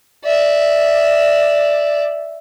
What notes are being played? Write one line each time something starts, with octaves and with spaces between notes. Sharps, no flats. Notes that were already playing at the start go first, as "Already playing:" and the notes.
D5 E5